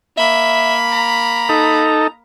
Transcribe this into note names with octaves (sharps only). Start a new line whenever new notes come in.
A#3 E5 B5
A#5
D#4 A4